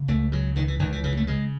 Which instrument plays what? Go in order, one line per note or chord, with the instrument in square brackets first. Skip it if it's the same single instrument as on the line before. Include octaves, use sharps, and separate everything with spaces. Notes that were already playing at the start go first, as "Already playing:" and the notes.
Already playing: [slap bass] C#3
C#2 A3
C#3 F#3
C#2 D#3
E3
C#2 D#3
E3
C#3 E3
A3
C#3 G#3